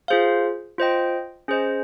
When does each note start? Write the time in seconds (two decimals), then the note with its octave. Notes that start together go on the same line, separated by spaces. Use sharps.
0.08 F4 G#4 C5 F5
0.78 F4 C5 D#5 G5
1.48 C#4 G#4 C5 D#5